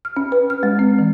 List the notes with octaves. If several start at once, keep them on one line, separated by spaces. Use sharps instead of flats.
F6
C#4
B4
F6
G#3
C4
E3